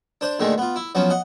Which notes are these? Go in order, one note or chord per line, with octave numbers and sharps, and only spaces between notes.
D4 C5 D5
D#2 A#2 D3 D#3 G#3 A3
B3 F4
E4
F3 F#3 B3 C#4
D#5 F#5